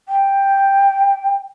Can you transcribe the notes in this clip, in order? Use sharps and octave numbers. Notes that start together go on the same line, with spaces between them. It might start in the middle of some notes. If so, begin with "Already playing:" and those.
G5